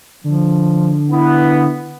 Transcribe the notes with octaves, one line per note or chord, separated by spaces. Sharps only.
D3 F3
B3 E4